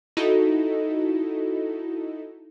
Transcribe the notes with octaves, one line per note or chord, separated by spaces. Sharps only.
D#4 E4 F#4 A4 D#5